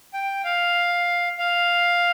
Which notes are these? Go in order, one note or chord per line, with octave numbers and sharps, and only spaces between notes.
G5
F5
F5